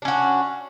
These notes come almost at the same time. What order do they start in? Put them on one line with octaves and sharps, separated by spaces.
D4 C#4 F#4